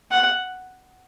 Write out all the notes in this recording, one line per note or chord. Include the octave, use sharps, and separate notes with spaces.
F#5